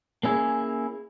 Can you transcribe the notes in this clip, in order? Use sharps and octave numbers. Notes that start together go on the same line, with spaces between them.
A#3 C#4 E4 G#4